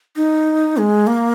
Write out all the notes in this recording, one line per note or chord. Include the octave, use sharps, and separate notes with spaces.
D#4
G#3
A#3